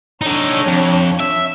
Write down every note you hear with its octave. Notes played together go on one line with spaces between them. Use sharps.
D4 D#4 A4 C#5
F2
E5